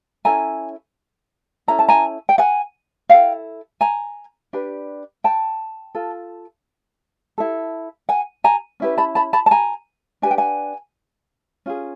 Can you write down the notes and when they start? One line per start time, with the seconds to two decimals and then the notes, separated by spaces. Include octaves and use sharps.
0.25 C#4 E4 A4 G#5 A#5
1.68 C#4 E4 A4 A#5
1.79 A5
1.89 G#5 A#5
2.29 G5
2.38 F#5 G#5
3.09 E4 A4 F5 G5
3.81 G#5 A#5
4.53 D4 G4 B4
5.24 G5 A5
5.95 F4 A4
7.38 E4 A4
8.09 F#5 G#5
8.44 G#5 A#5
8.80 C#4 E4 G4 B4
8.98 A5 B5
9.15 A5 B5
9.33 A5 B5
9.46 A5
9.51 G#5 A#5
10.22 D4 G4 B4 G#5
10.31 G5
10.38 F#5 G#5
11.66 C#4 F4 G#4